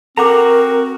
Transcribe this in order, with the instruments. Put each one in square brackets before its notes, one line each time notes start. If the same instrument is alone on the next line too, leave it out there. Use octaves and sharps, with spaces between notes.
[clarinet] C4 [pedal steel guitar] F#4 A#5 [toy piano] A4 F#5 D6 [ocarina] A#4